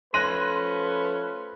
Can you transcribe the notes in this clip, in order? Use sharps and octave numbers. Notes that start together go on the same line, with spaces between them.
F3 A3 C#4 B4 C6 F#6 A#6 D#7